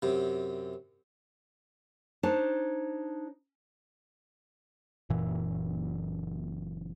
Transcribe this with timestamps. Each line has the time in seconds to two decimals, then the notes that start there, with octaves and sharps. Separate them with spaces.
0.02 F#2 C3
2.23 D4 D#4 C5 C#5 A5
5.10 F#1 F#2 A#2 E3